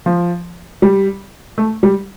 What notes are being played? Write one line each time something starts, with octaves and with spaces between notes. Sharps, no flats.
F3
G3
A3
G3